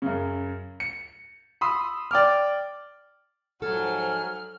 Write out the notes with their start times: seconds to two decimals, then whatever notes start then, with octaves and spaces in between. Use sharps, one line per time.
0.02 F#2 C#3
0.80 C#7
1.61 B5 C6 D#6 E6
2.11 D5 G5 D6 F6
3.62 G#2 F3 F#3 A4 G#5 F6